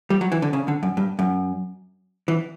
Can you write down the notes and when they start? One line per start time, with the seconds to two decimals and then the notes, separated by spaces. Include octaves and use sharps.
0.10 G3
0.21 F#3
0.32 E3
0.42 D3
0.53 C#3
0.68 D3
0.83 F#2
0.97 G2
1.19 F#2
2.28 E3